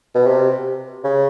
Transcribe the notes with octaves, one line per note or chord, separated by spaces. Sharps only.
B2
C3
C#3